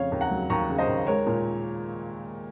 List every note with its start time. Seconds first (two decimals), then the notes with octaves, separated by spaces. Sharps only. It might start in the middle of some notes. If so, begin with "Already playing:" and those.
Already playing: F2 C#3 C#5 F5
0.12 D#2
0.21 F#5 A#5
0.31 F#3
0.50 D#2 A#5 C#6
0.69 C#3
0.78 C5 D#5
0.88 D#2
1.07 G#3 A#4 C#5
1.26 A#2